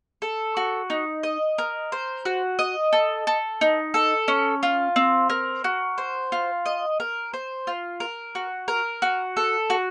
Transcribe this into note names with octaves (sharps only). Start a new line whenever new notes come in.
A4
F#4
D#4
D#5
A#4
C5
F#4
D#5
A4
A4
D#4
A4
C#4
F4
C4
A#4
F#4
C5
F4
D#5
A#4
C5
F4
A#4
F#4
A#4
F#4
A4
F#4